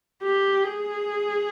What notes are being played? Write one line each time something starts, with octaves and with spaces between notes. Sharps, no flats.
G4
G#4